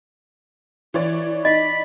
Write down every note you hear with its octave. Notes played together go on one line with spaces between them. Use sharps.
E3 E4 C#5 D5
D#4 D5 D#5 B5